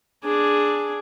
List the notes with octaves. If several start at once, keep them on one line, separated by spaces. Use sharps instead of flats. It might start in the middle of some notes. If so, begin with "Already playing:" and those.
D4 G#4